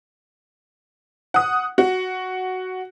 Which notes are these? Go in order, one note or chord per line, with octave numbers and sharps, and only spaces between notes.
F#5 D#6
F#4